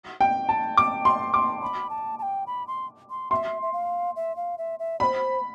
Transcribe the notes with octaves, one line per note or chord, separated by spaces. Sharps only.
G5
A5
D6
C6
D6
B5
A5
A5
G5
B5
C6
C6
E5 C6
E5
F5
E5
F5
E5
E5
C5 D5 B5